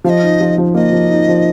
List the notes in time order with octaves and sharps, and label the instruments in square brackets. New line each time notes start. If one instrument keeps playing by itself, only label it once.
[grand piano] F3 [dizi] F5
[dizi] D#5
[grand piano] D#4
F3
F3
[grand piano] A#3 [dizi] D#5
[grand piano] F3
D#4
F3